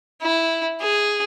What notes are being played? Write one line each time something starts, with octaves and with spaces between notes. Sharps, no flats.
E4
G#4